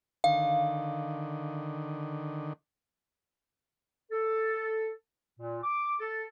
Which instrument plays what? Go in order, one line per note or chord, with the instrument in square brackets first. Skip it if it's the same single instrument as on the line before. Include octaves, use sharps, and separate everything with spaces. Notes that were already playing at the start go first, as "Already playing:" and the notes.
[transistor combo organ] D3 D#3 [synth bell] F5
[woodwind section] A4
A#2
D6
A4